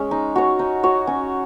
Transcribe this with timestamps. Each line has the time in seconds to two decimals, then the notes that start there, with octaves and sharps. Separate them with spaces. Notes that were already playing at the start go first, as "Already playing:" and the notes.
Already playing: G#3 C#4
0.11 D#4
0.36 F#4 C#5
0.59 D#4
0.83 F#4 C#5
1.07 C#4